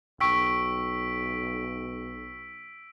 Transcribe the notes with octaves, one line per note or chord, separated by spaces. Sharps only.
B1 G5 C#6 E6 B6 D7